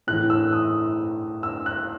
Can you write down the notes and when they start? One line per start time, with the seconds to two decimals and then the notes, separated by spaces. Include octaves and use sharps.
0.07 A2 F#6
0.12 E3
0.30 E6
0.53 D#6
1.43 E6
1.66 F#6